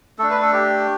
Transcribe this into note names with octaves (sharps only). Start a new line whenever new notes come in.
A3 D4 A4
B4
A4
G4